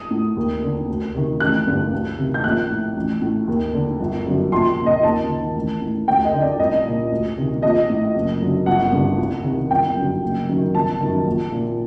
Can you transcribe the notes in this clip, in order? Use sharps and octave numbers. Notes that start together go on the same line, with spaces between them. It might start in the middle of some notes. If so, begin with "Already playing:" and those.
Already playing: D#6
A2
D#2
D3
D2
C3 D#3
A1 F#6
G2 D3
D2
C3 D#3
G6
A#1 F#6
A2
A1
A2
D#2
D3
G1
F#2 D3
A#1 C6
A#2
D#5
D#2 A5
D#3
A1
A2
D2 G5
D#5
D3
D5
C2 D#5
A#2
D2
C3 D#3
A#1 D#5
A2
F#1
F#2 D3
G1 F#5
G2 D3
C2
C3 D#3
G1 G5
F#2 D3
F#1
F#2 D#3
G1 A5
F#2 D#3
A#1
A#2